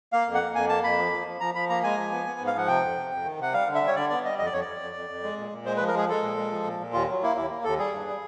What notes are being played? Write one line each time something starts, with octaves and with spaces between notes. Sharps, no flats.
A#3 F5
F2
F#5
A#3
F2 G#5
A#3 A5
F2 B5
F3
F3
F3
F3 A#5
F3 B5
A#3 A#5
G#3 G#5
F3
B3
B3
G#2
F5
F3 F#5
C3 G5
F2
C3
F2
D#3
C3 F#5
G3 F5
D3
E5
G3
C#5
D3 D5
B3 D5
G3 D#5
F2 D#5
D5
F2 C#5
D5
F2
F2
F2
F2
G#3
A#2
A#2
G#3 C5
B4
F3
A#4
G#3 G#4
G#3 A4
A#2
G#3
F3
A#2
A#2
D#2 F4
F#3
A#3 E4
D#2 E4
A#3
D#2 A4
G3 G#4
G2
G3